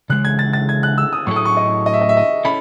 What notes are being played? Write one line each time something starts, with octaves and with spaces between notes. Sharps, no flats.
C#3 E3 G#3 F#6
G#6
A6
A6
G#6
F#6
E6
D#6
A2 F#3 A3 E4 A4 C#6
D#6
C#6
D#5
D#5
E5
D#5
E5
D#5
C#4 E4 A4 B5